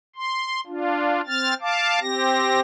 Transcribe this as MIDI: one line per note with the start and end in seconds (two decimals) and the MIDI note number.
0.16 0.61 84
0.67 1.21 62
0.67 1.21 65
1.27 1.54 60
1.27 1.54 89
1.27 1.54 93
1.61 1.99 77
1.61 1.99 81
1.61 1.99 86
2.01 2.60 60
2.01 2.60 67
2.01 2.60 94